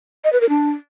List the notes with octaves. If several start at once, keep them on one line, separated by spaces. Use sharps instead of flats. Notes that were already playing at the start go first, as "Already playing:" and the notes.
D#5
B4
A#4
D4